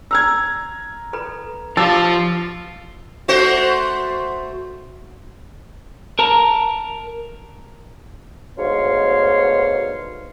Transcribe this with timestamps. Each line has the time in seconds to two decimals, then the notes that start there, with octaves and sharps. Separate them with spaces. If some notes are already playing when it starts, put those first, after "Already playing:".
0.11 A#5 E6 F6 G#6
1.13 A4 B4 B5
1.77 F3 F4 G4 A5 D6 E6 A6
3.28 A3 F#4 C5
6.19 A#4 A5 A#5
8.57 D2 G#2 B2 C#5 F5 C6